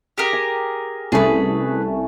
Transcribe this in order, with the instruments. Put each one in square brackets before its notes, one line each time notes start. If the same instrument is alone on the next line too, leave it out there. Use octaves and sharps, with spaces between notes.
[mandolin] G4 G#4 A#4
[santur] G#5
[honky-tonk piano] C2 [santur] A3 C#4 A5 [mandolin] G#4 B4